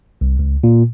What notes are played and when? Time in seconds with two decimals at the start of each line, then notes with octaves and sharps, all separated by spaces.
0.21 C2
0.39 C#2
0.64 A#2